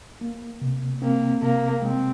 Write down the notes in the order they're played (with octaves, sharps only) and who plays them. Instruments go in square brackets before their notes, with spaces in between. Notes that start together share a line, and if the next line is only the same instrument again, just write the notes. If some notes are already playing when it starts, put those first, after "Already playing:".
[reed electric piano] A#3
C3
[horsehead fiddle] A#3 [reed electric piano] C4
[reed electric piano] C3 [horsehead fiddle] A#3
[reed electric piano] G#3 [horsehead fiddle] C4